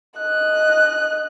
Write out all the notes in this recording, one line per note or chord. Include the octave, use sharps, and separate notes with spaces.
D#5 F#6